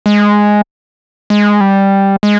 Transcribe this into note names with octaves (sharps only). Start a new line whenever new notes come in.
G#3
G#3
G3
G#3